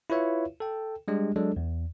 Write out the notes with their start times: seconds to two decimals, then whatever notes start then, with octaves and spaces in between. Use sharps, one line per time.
0.10 E4 F4 B4 C#5 E5 F5
0.60 A4 G5
1.08 G3 G#3 D4 G4
1.36 F#3 G#3 D4 A4
1.56 E2